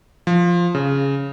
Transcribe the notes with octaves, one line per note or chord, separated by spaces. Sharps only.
F3
C#3